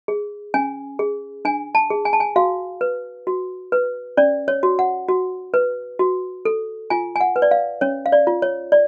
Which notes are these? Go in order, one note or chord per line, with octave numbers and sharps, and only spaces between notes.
G#4
C#4 G#5
G#4
D4 G#5
A5
G#4
G#5
A5
G#5
F#4 F5
B4
F#4
B4
C#4 D5
C#5
F#4
F#5
F#4
B4
F#4
A4
F4 G#5
G#5
F#5
B4
D5
F5
C#4 C#5
F5
D5
F4
C#5
D5